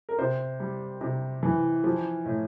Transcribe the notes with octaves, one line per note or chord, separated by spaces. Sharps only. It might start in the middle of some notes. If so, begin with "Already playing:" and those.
A#4
C3 C5
G3
C3
E3
F3
A2